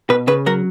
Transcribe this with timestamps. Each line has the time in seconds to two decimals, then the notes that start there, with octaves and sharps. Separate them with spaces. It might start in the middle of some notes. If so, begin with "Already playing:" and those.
0.10 B2 B4
0.28 C#3 B4
0.46 F#3 A#4